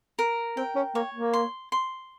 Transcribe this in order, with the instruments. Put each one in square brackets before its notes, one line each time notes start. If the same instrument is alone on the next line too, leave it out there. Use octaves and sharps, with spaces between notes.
[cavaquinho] A#4
[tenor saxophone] C4 [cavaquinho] G5
[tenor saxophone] C#4
[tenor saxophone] A#3 [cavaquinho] C#5
[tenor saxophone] A#3
[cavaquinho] C6
C6